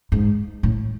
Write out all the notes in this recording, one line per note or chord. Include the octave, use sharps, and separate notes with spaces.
G#2
A2